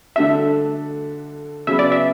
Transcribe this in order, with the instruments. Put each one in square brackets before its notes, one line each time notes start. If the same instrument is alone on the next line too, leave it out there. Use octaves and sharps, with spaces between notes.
[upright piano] D3 A3 D4 F#4 [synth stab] E5
[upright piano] C#3 F#3 B3 [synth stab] E5
[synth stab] D5
E5